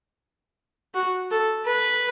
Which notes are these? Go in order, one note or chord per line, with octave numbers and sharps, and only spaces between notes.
F#4
A4
B4